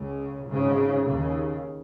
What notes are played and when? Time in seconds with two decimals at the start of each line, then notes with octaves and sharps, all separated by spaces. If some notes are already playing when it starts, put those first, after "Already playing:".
Already playing: C#2 C#3
0.47 G#1 G#2 C#3
1.06 D#2 C#3